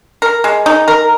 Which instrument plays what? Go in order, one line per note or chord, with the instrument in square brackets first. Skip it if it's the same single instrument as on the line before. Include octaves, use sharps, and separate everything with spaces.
[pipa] A#4
G#3
D#4
A#4